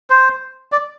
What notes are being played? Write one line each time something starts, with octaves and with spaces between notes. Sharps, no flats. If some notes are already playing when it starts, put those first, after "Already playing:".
C5
D5